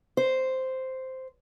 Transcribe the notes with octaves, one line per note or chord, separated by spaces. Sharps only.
C5